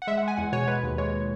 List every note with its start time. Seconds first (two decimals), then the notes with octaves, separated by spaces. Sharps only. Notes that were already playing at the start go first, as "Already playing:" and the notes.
0.02 F#5
0.07 G#3 E5
0.17 F#5
0.23 G#3 G#5
0.37 E2 F#5
0.52 B2 C#5
0.67 G#3 B4
0.83 D#2
0.98 G#3 C#5